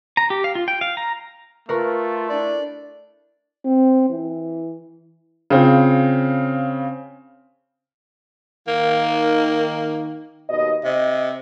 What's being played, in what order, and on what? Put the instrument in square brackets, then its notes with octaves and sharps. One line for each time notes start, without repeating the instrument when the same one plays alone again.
[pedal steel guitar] A#5
G4
F5
F4
G5
F5
A#5
[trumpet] A3 [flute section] F4 [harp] A#4 B4 C#6
[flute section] D4 E4 [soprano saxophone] D5
[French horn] C4
E3
[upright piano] C#3 C4 F4
[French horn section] D#3 [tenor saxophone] A#3
[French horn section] D#2 B2 D#5
[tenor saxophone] C3 [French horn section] D#5